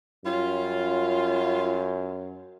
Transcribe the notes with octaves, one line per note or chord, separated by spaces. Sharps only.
F#2 G3 C#4 F4